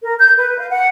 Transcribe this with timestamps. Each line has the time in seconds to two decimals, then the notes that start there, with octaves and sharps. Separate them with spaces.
0.02 A#4
0.18 G6
0.37 B4
0.58 F5
0.70 F#5